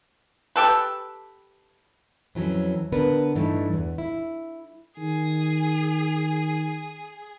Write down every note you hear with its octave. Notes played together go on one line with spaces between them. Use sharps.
G4 A4 B4
F2 E3 F#3 C#4
D3 B3 D4 A#4 B4
G2 E3 A3 D#4
E2
E4
D#3 G#4